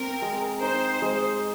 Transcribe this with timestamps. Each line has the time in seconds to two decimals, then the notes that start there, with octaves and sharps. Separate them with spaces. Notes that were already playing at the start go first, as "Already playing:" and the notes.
Already playing: C4 A#4
0.22 G#3
0.61 D#4 C5
1.02 G#3